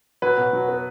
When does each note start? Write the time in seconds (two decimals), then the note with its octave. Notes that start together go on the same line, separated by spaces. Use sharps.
0.22 F#3 B4
0.37 B2
0.53 F#3
0.68 B3